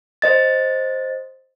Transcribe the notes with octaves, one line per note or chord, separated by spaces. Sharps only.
C5 D#5 A6